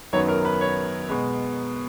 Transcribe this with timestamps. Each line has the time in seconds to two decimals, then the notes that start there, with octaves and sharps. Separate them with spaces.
0.13 F#2 D#3 F#3 B3 C#5
0.28 A#4
0.45 B4
0.61 C#5
1.09 B2 G#3 B3